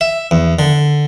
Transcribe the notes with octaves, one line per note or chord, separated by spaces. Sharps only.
E5
E2
D3